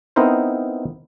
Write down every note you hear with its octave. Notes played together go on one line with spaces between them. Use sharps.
B3 C4 D#4 E4 A#4 C5